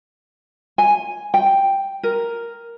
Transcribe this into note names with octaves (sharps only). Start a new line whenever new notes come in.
G#5
G5
A#4